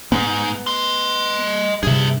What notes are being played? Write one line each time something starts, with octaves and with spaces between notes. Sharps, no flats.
G#2 B3
D#5 C6
G2 C3 G#4 E5